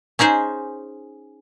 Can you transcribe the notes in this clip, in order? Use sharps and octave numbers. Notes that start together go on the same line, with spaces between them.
C#4 D#4 G#4 C5